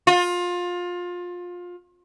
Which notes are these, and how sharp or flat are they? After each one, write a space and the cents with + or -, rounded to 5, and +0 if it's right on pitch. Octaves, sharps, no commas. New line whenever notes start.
F4 +25